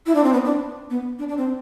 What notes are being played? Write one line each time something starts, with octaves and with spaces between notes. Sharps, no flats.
E4
D4
C4
B3
D4
B3
D4
D4
C4